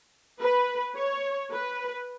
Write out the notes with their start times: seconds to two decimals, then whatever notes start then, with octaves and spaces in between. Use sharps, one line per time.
0.41 B4
0.96 C#5
1.51 B4